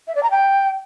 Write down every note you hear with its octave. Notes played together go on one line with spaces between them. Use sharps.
E5
D5
A#5
G5